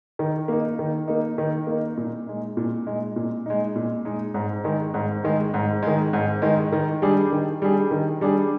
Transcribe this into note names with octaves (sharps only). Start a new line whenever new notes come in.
D#3
A#3 D#4
D#3
A#3 D#4
D#3
A#3 D#4
A#2
G#3 D#4
A#2
G#3 D#4
A#2
G#3 D#4
A#2
G#3 D#4
G#2
D#3 G#3
G#2
D#3 G#3
G#2
D#3 G#3
G#2
D#3 G#3
D#3
G3 D4 G#4
D#3
G3 D4 G#4
D#3
G3 D4 G#4